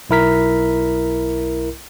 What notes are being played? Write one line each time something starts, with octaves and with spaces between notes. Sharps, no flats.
B1 E4 A#4 B6